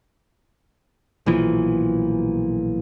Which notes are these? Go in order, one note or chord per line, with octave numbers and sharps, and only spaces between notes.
B1 A#2 E3 F3